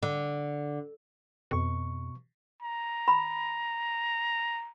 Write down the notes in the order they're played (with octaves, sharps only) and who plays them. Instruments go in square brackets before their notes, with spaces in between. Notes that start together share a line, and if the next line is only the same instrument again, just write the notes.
[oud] D3
[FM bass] F2 [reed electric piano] B2 C#6
[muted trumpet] A#5
[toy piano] B5